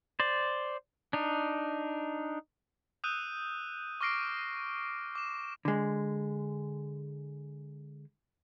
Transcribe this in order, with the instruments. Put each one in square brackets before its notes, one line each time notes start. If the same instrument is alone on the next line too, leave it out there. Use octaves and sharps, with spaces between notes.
[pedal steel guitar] C5 D5
D4 D#4
[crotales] D#6 E6 F#6 G6 D#7
C#6 D6 F6 A#6 C7 D7
D6 E7
[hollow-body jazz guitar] D3 G#3